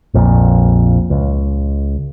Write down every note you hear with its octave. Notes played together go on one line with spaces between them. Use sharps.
A#1 F2 A#2
C#2